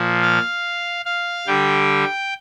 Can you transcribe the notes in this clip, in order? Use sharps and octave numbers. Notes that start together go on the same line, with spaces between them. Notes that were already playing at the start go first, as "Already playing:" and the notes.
Already playing: A#2 F3
F5
F5
D3 G3 G5